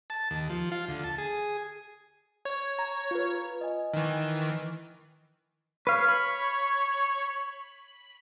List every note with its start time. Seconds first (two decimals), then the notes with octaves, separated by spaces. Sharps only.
0.10 A5
0.30 D#2
0.50 F3
0.72 F4
0.88 D2
1.04 A5
1.18 G#4
2.45 C#5
2.79 A#5
3.11 F4 B4
3.61 D#5 G#5
3.94 D#3 E3
5.87 B4 C#5 F5
6.09 B5